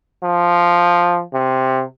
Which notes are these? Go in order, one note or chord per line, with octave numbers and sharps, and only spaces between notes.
F3
C3